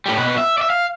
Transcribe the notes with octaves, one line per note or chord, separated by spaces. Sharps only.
A2 G3
B2 B4
E5
D5 E5
F5